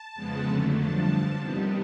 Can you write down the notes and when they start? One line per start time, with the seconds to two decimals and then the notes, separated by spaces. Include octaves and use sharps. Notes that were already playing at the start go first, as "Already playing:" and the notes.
Already playing: A5
0.15 F2 C#3 F3 G#3 B3
0.46 F2 D3 F#3 A3
0.76 G2 D3 F3 A5
1.06 G2 D3 F3
1.36 C3 D#3 G3 B3